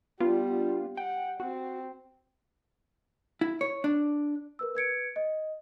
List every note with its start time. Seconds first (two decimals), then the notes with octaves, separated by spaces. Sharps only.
0.20 G3 B3 D4 F4
0.97 F#5 G5
1.40 C4 F#4
3.41 E4
3.61 C#5
3.84 D4
4.59 A#4 B4 E6
4.75 B4 G#6 C#7 D7
5.16 D#5